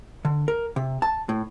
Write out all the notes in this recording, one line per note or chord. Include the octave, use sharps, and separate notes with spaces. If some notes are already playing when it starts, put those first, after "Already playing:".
D3
A#4
C3
A5
A2